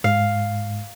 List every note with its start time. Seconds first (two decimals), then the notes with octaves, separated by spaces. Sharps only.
0.04 G#2 F5